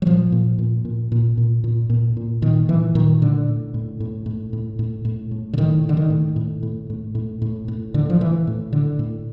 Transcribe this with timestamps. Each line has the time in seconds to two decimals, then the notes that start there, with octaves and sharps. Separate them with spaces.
0.02 F#3
0.06 A#2 F3
0.32 A#2
0.58 A#2
0.85 A#2
1.12 A#2
1.37 A#2
1.64 A#2
1.90 A#2
2.17 A#2
2.42 A#2 D#3
2.69 A#2 E3
2.95 A#2 D#3
3.22 A2 D3
3.48 A2
3.74 A2
4.00 A2
4.26 A2
4.53 A2
4.79 A2
5.05 A2
5.31 A2
5.53 D3
5.58 A2 D#3
5.84 A2
5.89 D3
5.97 D#3
6.10 A2
6.36 A2
6.63 A2
6.90 A2
7.15 A2
7.42 A2
7.68 A2
7.94 A2 D3
8.10 F3
8.21 A2 E3
8.47 A2
8.73 A2 D3
8.99 A2